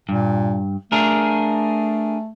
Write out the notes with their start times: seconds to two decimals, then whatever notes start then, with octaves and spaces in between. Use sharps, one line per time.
0.09 G2 A#2
0.92 A3 D4 G#4 A#4